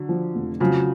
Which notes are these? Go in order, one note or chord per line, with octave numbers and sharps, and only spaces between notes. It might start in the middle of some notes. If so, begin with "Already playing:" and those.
Already playing: D3 F#3
F3
F1
C#3 F3 F#3